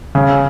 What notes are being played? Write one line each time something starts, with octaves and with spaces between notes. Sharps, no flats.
C#3